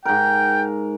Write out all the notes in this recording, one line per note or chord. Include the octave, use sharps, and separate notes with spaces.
G#2 A#4 G5